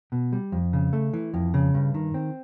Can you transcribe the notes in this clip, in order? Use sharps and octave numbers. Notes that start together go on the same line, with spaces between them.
B2
G3
F2
C#3
A3
E3
F2
C#3
G2
D#3
C4